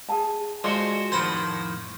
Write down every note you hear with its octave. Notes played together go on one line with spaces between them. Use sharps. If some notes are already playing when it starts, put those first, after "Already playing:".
G#4 G#5 A5
G#3 F4 F#4 C5 D5
F2 A2 D#3 C5 F#5 B5